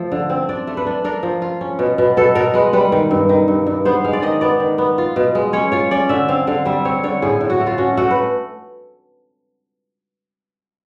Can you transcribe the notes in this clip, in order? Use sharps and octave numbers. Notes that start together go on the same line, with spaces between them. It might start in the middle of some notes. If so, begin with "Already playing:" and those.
Already playing: F3 A3
D3
C4
D4 D5
A3
B4
D4
D4 A#4
F3
F4
C#4
B2
B2
B2 A4
B2 A#4
G#3 B4
G3 B4
D#3
G2
D#3
G2
G2
B3 C5
G#3 F5
D5
D#3 D#5
B3 D5
D#3
B3
F4
B2
G#3
C#4 C#5
F4 C#5
C#4 D5
D3 E5
C4 F5
D3 F5
G3 E5
C4 C#5
D3 C#5
A2 G#4
A2
F#4
A3
F4
C#4 F#4
A3 F#4
B4